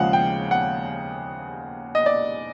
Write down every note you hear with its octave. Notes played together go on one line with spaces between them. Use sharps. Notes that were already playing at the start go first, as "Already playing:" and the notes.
Already playing: D#2 C#3 F3 G#3 F5 F#5
G5
F#5
D#5
D5